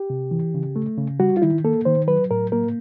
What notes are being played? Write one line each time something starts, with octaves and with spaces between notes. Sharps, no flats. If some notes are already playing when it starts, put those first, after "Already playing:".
Already playing: G4
C3
E3
C#3
A3
C#3
G3 F#4
F4
D#3 E4
A#3 A4
D#3 C5
F#3 B4
A2 A#4
A#3 A#4